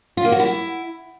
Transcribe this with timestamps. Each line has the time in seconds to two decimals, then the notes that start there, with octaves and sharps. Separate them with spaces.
0.17 F4
0.25 A#3
0.32 F#4
0.40 E4